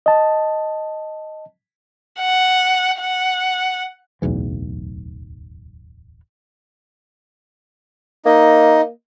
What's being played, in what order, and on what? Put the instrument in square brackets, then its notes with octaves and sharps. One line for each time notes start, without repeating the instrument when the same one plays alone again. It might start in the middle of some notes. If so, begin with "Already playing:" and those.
[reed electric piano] D#5 A5
[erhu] F#5
F#5
[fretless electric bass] D1 B1 E2 E3
[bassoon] A#3 [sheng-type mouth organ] D#4 D#5